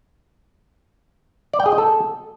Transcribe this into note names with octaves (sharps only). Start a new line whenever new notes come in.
D5
G5
G#4
D#5
A4